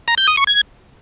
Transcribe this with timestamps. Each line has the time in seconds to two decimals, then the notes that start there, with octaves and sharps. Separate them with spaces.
0.08 A#5
0.18 G6
0.27 D#6
0.37 C#6
0.47 G#6